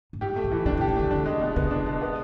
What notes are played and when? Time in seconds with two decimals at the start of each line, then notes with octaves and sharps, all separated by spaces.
0.13 A2
0.21 G#2 G4
0.36 A3
0.44 A2
0.51 E3
0.65 B2 D4
0.77 C3
0.81 G4
0.88 D3
0.96 D#3 A3
1.11 D3 D4
1.26 G#3
1.41 B2
1.56 C#3 B3
1.71 D4
1.86 G#3
2.02 B3